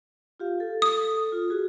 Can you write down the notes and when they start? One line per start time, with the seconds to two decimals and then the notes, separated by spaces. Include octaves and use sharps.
0.40 F4 G4 F5
0.60 A4
0.82 D#6
1.32 F4
1.50 F#4 G#4